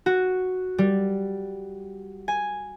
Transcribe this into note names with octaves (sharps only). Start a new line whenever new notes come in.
F#4
G3
G#5